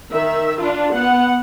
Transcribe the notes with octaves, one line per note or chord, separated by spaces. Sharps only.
D#3 E5
D4 F4
B3 F#5